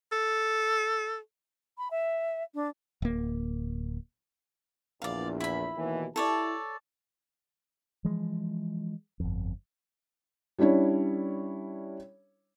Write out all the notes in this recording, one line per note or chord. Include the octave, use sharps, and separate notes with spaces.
A4
B5
E5
D4
D1 A#3
A#1 E2 D5 F5
E4 B5
D#2 B2 E3
E4 G4 A4 C#5 D5 A5
E3 F3 G#3
G1 F2
G3 C#4 D4 E4 C#5